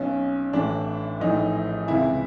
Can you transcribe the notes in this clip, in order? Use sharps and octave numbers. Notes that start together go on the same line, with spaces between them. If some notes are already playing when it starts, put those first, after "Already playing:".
Already playing: B1 B2 C#4
A1 A2 E3 D4
A#1 A2 E3 D#4
C#2 C3 E3 E4